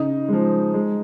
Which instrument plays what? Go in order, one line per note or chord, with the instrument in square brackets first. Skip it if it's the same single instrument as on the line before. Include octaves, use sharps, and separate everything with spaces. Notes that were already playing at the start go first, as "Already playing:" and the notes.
Already playing: [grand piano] C#3 [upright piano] D#4
[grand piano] F3 G#3
G#3